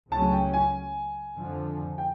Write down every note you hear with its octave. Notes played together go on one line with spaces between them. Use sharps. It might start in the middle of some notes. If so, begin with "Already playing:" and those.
C#2 C#3 F#3 A3 C#4 A5
G5
G#5
F2 D3 F3
G5